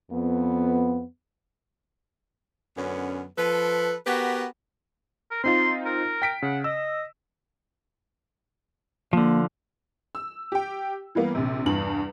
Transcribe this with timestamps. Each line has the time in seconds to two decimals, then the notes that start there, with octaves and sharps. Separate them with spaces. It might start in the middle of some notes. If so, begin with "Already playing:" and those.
0.11 F2 B3
2.77 F#2 D3 B3 C#4
3.37 F3 A4 B4
4.06 B3 F#4 G4 A#4 B4
5.31 A#4
5.44 C4 D#4 F4 C6
5.85 A#4
6.22 G5 B6 D7
6.42 C#3 F#5
6.64 D#5 E6
9.13 D3 F3 A#3
10.15 E6
10.52 G4 G5
11.15 E3 G3 A#3 B3
11.35 A#1 C3
11.66 E2 G2 F#7